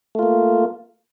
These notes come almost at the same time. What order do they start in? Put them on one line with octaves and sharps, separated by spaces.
A3 F4 A#3